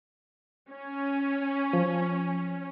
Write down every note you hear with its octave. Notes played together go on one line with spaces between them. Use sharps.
C#4
F3